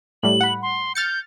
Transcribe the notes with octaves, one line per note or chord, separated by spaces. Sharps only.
A2 G3 F#7
F#5 B5
C6
F6 G6 A6 C#7